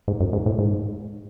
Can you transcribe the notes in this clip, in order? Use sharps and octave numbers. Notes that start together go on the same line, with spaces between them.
G#2
F#2
G#2
A2
G#2